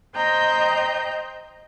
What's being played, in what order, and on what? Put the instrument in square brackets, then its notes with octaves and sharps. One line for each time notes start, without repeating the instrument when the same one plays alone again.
[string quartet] C5 D#5 G5 A#5 G6